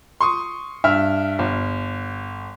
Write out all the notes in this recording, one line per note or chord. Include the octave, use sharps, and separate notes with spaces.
C6 C#6 D#6
G2 E5 F6
G1